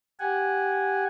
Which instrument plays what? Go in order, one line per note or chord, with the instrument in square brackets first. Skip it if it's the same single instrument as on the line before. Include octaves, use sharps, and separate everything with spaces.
[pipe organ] G4 F#5 G#5